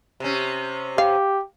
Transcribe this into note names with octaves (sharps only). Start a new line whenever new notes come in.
C3 C#4
G4 F5